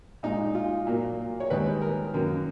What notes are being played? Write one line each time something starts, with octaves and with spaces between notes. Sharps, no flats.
A#2 G#3 D#4
F4
A#2 F#3 A#3
C#5
D#2 D#3 G#3 B4
A#4
F#2 D#3 F#3 A#3